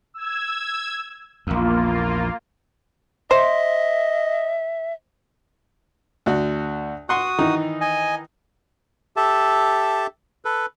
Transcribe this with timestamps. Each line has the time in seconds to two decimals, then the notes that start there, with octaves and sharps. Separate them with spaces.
0.14 E6 G#6
1.47 A#1 E2 A#3 F4
3.31 C5 D#5 E5
6.26 D2 F#4
7.09 F#4 F#5 C6 C#6 D#6
7.38 D#3 E3 D#4
7.81 D#5 G#5
9.16 G4 A4 E5 A5
10.45 A4 B4